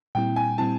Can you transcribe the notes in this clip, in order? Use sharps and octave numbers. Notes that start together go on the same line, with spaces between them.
A#2 G3 C4 E4 G5
G#5
A#2 G3 C4 E4 A5